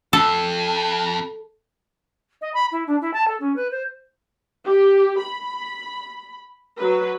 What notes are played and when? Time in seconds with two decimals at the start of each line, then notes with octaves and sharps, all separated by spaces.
0.13 F2 A4
2.41 D#5
2.54 B5
2.71 E4
2.87 D4
3.01 E4
3.13 A5
3.27 A4
3.40 C#4
3.56 B4
3.71 C5
4.66 G4
5.20 B5
6.78 F#3 B4